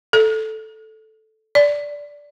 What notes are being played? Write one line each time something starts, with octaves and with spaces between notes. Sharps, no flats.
A4
D5